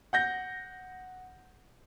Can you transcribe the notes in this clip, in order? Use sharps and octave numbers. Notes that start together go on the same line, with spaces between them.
F#5 G6 A#6